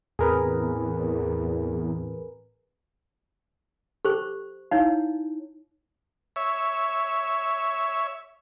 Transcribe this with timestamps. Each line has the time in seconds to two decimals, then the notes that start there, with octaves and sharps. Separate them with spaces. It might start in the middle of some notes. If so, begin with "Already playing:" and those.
0.19 E2 A2 E3 C4 G#4 A#4 B4
4.05 G4 A4 C5 C#6
4.71 D#4 E4 C#5 F5
6.36 C#5 E5